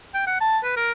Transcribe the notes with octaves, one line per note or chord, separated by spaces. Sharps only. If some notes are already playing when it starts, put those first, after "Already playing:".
G5
F#5
A5
B4
A#4